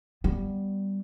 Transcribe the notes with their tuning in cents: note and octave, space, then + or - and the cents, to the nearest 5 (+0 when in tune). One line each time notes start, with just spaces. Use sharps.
G3 +0 B3 +0